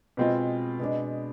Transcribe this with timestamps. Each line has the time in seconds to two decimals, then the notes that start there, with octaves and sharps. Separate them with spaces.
0.17 B2 G#3 C4 F4
0.80 B2 G#3 D4